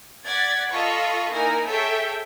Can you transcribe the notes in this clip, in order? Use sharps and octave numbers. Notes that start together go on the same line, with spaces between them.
D5 F#5 G#6 A6 B6
F4 A4 D#5 B5 C#6
A#3 D#4 E4 A#4 G#5
G#4 A4 C#5 E5 G5